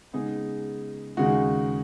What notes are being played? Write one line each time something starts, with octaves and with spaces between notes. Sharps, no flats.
C#3 G#3 B3 D#4 G#4
D#2 C#3 G#3 D#4 F#4